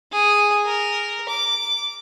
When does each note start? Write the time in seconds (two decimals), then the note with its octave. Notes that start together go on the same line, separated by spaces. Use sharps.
0.12 G#4
0.66 A#4
1.29 D6